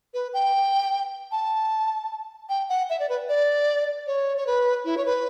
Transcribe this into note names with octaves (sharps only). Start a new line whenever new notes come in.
B4
G5
A5
G5
F#5
E5
D5
B4
D5
C#5
C#5
B4
E4
C#5
B4